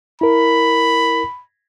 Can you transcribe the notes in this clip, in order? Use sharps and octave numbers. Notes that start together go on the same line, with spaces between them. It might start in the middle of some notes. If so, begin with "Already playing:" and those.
E4 A#4 B5